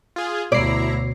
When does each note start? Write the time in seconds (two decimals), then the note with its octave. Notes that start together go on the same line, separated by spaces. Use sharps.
0.16 F4 G#4
0.52 D2 B2 E4 C#5 D5 A#5 C7